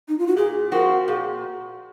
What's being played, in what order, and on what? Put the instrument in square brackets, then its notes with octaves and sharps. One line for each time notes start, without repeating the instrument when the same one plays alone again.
[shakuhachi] D#4
F4
F#4
[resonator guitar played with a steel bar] A#2 [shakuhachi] G#4
[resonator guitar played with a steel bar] F3 C4 F#4 [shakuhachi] A#4
[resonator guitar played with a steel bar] A#2 [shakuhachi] G#4